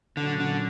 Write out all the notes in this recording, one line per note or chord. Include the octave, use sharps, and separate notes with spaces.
A#2 D3 F#3 C#4 F#4
D3